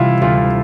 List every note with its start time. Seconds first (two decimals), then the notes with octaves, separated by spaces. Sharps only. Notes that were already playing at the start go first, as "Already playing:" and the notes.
Already playing: C3 E3 G3 E4 F4
0.22 D2 F4